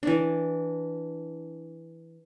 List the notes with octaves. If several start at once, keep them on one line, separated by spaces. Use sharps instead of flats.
E3 D4